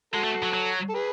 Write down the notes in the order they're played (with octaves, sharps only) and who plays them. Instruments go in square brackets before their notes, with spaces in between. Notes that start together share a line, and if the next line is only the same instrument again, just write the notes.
[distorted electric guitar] G#3 [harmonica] F#4 A4
[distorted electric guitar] A3
F#3
F#3
[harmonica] A4
G#4 B4